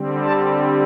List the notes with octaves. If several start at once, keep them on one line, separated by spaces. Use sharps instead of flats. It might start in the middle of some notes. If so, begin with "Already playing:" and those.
Already playing: D3 G3 C4
A5